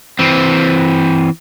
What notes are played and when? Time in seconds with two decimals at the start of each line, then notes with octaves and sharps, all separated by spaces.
0.19 E3 C4